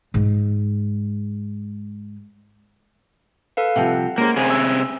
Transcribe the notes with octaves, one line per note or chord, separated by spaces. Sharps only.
G#2 G#3
A4 B4 F5
C3 F3 G3 F#5
G#3 A#3 C#4 C5
C3 G#4
E6